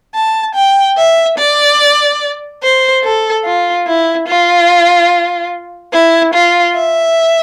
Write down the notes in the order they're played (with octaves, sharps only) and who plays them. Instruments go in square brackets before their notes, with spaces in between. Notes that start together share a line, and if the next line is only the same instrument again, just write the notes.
[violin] A5
G5
E5
D5
C5
A4
F4
E4
F4
E4
F4
E5